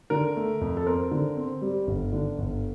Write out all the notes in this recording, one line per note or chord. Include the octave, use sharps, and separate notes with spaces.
D3 A#4
A3
F2
A4
C4 A#4
D3
C4
G3
G1
D3
G1